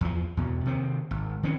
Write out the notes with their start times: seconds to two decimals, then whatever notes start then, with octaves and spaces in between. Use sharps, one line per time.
0.01 E2 F3
0.37 E2 B2
0.65 C3 D#3 C4
1.11 G#1
1.43 D#3 E3 C4 C#4